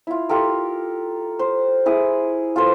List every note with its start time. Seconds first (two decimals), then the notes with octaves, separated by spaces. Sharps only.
0.07 E4 F4
0.29 F4 G4 A4 A#4
1.39 C5
1.86 E4 G#4 D#6
2.56 F4 A4 B4 C5